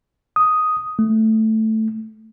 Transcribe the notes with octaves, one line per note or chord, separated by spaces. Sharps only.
D#6
A3